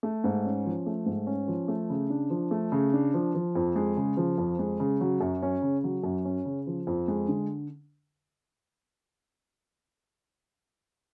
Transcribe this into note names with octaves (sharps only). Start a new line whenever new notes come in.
A3
G#2
C#4
F3
A3
G#2
C#4
F3
A3
C#3
D4
F3
A3
C#3
D4
F3
F3
F2
G#3
C#3
F3
F2
G#3
C#3
F#3
F#2
C#4
C#3
F#3
F#2
C#4
C#3
F3
F2
G#3
D3